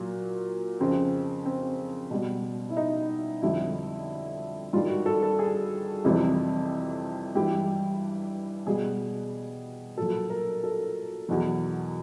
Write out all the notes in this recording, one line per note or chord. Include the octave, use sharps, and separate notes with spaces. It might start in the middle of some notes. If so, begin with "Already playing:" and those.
Already playing: A#2 F#3
F2 C#3 F3 C4
C4
B2 G3
E4
D#4
F2 D3 G3 E4
G2 D#3 G3 F4
F#4
A4
A4
G#4
F2 C3 E3 G3
G2 E3 G3 G4
B2 G3 G#4
A#2 F#3 A4
A#4
A4
E2 B2 F#3